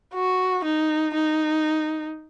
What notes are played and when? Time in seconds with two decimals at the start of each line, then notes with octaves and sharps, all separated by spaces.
0.14 F#4
0.64 D#4
1.14 D#4